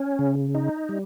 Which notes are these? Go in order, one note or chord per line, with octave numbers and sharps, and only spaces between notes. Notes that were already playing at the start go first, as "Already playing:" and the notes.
Already playing: C#4
C#3
D#4
G3